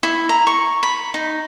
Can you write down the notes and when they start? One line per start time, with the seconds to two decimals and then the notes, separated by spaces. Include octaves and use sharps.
0.03 E4
0.29 A#5
0.47 C#6
0.83 B5
1.14 D#4